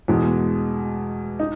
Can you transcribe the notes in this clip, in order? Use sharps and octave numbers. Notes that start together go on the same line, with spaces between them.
E2 B2 G#3
D#4